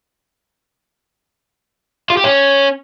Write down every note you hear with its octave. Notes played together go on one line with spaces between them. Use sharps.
F4
G4
C#4